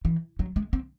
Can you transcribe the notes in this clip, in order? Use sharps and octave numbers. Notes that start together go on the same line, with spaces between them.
E3
F#3
G#3
C4